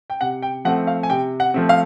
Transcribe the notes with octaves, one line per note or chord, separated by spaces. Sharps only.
G5
C3 F#5
G5
F3 A3 C4 F#5
F5
G#5
C3 G5
F#5
F3 A3 C4
F5